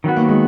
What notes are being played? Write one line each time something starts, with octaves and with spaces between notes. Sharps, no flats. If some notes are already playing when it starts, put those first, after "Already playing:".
D#3 F#3 B3 F#4
A#3
G#3